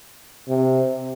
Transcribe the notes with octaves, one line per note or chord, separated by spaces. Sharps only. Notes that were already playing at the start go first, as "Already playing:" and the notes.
C3